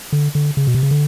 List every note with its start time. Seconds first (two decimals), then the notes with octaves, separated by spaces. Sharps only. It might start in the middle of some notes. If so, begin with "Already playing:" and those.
0.12 D3
0.35 D3
0.57 C#3
0.67 B2
0.75 C3
0.83 C#3
0.91 D3